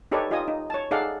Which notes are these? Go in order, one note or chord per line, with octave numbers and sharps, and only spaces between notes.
D#4 G4 A4 B4 C#5 D5
D#4 F4 G4 D#5 G#5 D#6
D#4
C#5 A5
D#4 G#4 A4 D5 F5 F#5